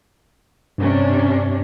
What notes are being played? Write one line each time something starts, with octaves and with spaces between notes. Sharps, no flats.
G2 C3 C#4 D4